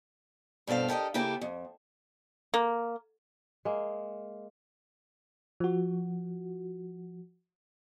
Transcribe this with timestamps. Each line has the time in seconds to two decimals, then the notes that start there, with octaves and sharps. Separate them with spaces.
0.67 G2 B2 C4 A4 F5
0.88 G4 A4 A#4 D5 D#5
1.14 C#3 A#3 E4 G4 A4
1.41 F2
2.54 A#3
3.65 G#3 A#3
5.60 F3 F#4